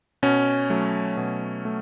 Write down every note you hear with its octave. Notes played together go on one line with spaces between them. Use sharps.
B2 C#4
F#3 A3
B2
A3